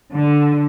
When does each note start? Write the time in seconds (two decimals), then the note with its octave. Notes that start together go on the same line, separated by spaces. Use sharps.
0.14 D3